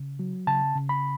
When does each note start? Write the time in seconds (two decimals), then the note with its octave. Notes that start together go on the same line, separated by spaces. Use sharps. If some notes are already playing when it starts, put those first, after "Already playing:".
Already playing: C#3
0.19 F#3
0.47 C#3 A5
0.76 C#3
0.89 B5